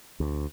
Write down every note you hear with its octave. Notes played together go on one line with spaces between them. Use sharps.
D2